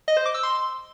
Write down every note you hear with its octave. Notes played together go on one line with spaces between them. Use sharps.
D#5
C5
D6
E6
C6